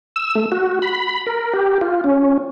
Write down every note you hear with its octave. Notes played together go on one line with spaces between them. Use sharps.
E6
A3
F#4
B5
A#4
G4
F4
C#4